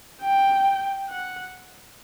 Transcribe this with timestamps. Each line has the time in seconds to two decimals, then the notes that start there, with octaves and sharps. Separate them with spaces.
0.22 G5
1.09 F#5